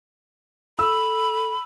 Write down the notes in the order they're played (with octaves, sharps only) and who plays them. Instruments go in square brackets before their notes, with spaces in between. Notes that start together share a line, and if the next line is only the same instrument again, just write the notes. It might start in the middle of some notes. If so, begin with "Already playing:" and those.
[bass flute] A4 [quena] B5 [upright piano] E6